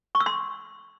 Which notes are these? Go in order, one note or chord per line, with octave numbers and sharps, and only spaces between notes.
C#6
E6
C6